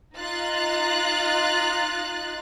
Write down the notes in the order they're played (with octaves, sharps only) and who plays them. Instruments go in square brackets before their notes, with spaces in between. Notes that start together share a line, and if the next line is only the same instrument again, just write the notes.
[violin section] D#4 F4 F#6 A6